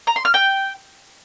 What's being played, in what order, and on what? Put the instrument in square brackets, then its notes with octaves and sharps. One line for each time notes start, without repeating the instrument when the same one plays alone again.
[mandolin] A#5
C6
F6
G5